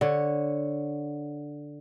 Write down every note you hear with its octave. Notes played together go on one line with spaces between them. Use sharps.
D3 C#5